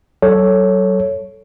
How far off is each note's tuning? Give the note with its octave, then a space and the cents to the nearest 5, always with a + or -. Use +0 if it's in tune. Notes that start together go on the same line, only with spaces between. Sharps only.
F#3 +40 A4 +0 C#5 +0